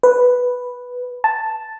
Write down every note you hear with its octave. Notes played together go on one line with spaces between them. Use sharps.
B4
A5